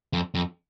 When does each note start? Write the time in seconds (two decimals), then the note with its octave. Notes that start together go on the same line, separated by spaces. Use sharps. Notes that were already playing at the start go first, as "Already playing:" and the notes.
0.13 F2
0.35 F2